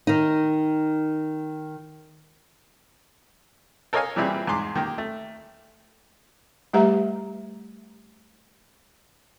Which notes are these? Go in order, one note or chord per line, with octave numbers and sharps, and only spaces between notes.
D#3 D#4
A4 A#4 C#5 D#5 F5 G#5
A#2 E3 G3 C4 E4 G#4
E2 G#2 G#4 C6 D6
D#3 A#3 G4
A3
G3 A3 G4 B4 E5 A#5